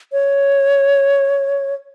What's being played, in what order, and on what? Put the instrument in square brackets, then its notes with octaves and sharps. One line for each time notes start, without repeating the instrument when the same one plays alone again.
[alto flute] C#5